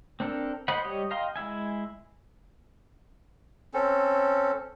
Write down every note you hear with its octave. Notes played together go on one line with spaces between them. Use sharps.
C4 D4 A4 A#4
C5 D#5 F#5 B5
G3 G4 C#5 D#5
D#5 F5 G5 A#5 C6
G#3 E4 E5 G#5
C4 C#4 A4